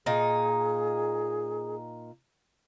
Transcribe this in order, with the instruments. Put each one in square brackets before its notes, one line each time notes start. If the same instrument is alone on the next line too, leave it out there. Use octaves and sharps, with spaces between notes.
[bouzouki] A#2 D#4 [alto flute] G#4